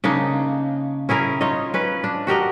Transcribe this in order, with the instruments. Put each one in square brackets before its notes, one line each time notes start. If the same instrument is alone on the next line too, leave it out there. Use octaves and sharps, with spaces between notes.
[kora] C#3 A#3 D4 D#4
C#4 E4 G#4 A#4
D#4 F4 C#5 D#5
C#4 B4
D4
F#4 G4 A#4 D#5